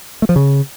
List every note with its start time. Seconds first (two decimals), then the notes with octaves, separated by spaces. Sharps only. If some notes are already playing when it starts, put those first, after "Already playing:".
0.22 A3
0.29 F3
0.36 C#3